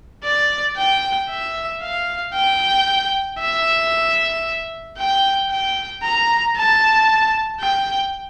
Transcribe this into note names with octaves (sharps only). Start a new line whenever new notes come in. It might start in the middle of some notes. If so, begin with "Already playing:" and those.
D5
G5
E5
F5
G5
E5
G5
G5
A#5
A5
G5